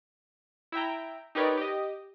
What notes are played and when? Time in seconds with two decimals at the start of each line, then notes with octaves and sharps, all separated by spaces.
0.72 E4 E5 G5 A#5
1.35 D#4 G4 A#4 B4 C#5 D5
1.57 G4 D#5